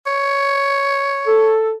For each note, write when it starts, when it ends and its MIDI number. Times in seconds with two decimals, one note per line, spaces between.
0.06 1.53 73
1.27 1.72 69